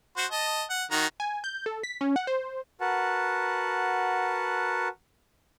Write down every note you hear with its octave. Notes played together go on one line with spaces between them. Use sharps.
F#4 C5
D#5 A5
F#5
D#3 F#4 A#5
G#5
G6
A4
B6
C#4
F#5
C5
F#4 A#4 B4 F#5 A5